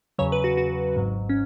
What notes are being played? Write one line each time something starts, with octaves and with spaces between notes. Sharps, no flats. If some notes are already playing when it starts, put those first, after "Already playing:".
E2 C#3 F#3 C#5
B4
F#4
F#4
G#1 G#2 F#3
C#4